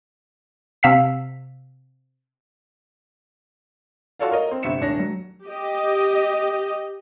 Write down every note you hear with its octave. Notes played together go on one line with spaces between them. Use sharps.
C3 F5 E6 B6
F4 F#4 A4 C#5 D5 F5
A#4 C#5 D#5
C4
G1 C3 E5 C#7 E7
D#1 D4 C#5 A#6
F#3
G4 D#5